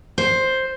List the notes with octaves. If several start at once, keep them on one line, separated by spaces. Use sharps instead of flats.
C5